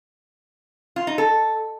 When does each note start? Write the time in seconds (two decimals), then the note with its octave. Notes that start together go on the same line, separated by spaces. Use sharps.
0.96 F4
1.07 D#4
1.18 A4